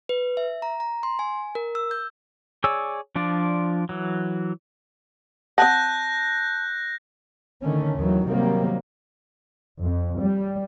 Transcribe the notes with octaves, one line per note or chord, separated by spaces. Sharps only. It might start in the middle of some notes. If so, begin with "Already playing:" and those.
B4
E5
A#5
A#5
C6
G#5
A#4
E6
G6
G#4 C#5 D5 G#5 E6
F3 D4 F4 D5
E3 F#3
C4 F#5 A5 F#6 G6 A#6
D3 D#3 A3 C#4
D#2 D#3 E3 F#3
C3 D#3 F#3 G3 A#3
F2
G3